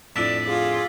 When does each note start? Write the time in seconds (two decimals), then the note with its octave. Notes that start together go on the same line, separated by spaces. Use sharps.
0.16 F2 A2 D4 D5 E6 A6 B6
0.46 F4 G#4 D6